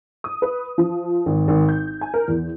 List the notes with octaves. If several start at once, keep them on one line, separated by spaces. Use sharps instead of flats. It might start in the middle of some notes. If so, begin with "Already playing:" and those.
D#6
B4
F3
G#1
G#1
G6
G#5
A#4
E2